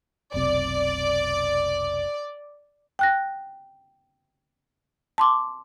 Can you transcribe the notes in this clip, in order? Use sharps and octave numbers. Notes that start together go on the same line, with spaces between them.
F1 B1 C3 D5
G5 F#6 A#6
A5 C6 D6